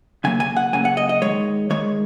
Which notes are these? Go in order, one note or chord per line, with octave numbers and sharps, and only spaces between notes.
C#3 F#3 A#3 G#5
G#5
F#5
C#3 F#3 A#3 G#5
F#5
D#5
D#5
D#3 G#3 C#5
D#3 G#3 C#5